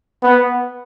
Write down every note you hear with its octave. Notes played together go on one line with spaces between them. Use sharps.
B3